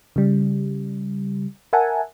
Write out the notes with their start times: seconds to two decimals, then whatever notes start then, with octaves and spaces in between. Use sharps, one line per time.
0.16 C#3 G3
1.73 A#4 E5 F#5 G#5 A5